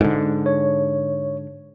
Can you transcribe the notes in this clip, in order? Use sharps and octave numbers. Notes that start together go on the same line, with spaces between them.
G#2 D3
C#5